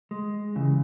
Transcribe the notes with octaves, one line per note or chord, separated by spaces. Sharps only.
G#3
D#2 C#3 E3